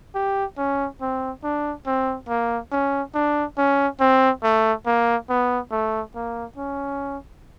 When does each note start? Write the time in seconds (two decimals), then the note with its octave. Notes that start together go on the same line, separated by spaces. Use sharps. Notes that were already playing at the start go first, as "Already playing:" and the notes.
0.15 G4
0.58 C#4
1.01 C4
1.44 D4
1.87 C4
2.29 A#3
2.72 C#4
3.15 D4
3.58 C#4
4.01 C4
4.43 A3
4.86 A#3
5.30 B3
5.72 A3
6.15 A#3
6.57 C#4